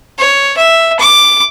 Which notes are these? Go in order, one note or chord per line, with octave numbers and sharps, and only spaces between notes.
C#5
E5
D6